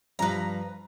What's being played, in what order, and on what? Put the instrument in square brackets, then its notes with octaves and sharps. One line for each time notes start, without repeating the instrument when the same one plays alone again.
[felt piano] G2 F3 [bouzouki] B4 A#5